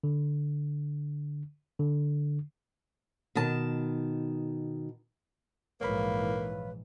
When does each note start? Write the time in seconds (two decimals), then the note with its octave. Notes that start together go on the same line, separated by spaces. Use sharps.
0.04 D3
1.79 D3
3.35 B2 D#3 A5
5.81 A#1 G#2 E3 A#3 B4 C#5 F5 B5